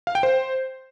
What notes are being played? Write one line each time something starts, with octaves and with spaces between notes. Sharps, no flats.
F5
G5
C5